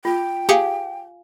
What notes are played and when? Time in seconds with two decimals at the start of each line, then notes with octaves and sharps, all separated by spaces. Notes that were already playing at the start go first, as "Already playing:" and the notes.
0.05 F4 G5
0.49 G4 G#4 F5 G#5 C#7